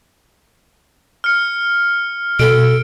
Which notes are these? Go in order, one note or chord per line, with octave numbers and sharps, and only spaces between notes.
F6 C#7
B2 A4 D7